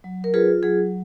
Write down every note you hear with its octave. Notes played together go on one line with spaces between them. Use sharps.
F#3
A#4
F4 G#4 B4
F#3 G#4